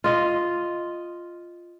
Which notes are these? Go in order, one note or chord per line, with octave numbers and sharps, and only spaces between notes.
F4 D#5